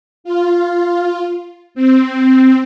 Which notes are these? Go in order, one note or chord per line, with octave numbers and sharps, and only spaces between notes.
F4
C4